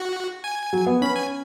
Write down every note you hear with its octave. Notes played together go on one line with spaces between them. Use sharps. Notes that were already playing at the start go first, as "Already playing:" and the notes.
Already playing: F#4
G#5
F#3
B3
C#4 B5
G#5